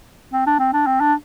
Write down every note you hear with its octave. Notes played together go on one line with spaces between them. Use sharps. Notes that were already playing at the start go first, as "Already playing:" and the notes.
C4
D4
C4
D4
C4
D4